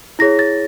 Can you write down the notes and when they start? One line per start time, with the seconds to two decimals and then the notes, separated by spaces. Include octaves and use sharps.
0.19 E4 G#4 C#5 A#6
0.39 A6